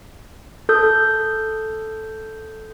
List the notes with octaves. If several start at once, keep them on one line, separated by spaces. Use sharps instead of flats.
A4 D#6 G6